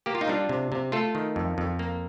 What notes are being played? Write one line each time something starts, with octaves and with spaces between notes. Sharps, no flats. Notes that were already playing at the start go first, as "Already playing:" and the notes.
A#3 G4
F4
D#4
G3 D4 F4
C3
C3
A3 F4 A4
D#3
F2
F2
A#3